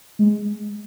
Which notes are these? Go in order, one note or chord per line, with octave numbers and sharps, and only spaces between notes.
G#3